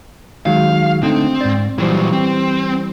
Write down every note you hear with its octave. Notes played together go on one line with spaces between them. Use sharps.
D#3 F#3 G#3 F5
D3 A3 C4 D#4
G#2 D5
A#2 E3 F#3 G3 C5
C4